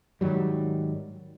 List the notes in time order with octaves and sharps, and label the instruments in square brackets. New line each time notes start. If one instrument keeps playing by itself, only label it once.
[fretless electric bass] G#2 D#3 F#3 G3